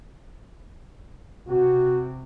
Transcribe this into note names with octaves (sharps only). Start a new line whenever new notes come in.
C3 F#4